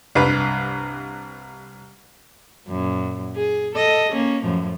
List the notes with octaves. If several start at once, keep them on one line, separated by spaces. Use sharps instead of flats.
C2 G2 B4
F#2 A#2
G#4
A4 D#5
A#3 C#4
F#2 A2 F3